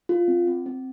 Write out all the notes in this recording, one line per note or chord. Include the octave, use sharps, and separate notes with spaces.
F4
C4
C4
C4